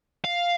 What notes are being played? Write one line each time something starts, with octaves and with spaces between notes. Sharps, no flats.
F5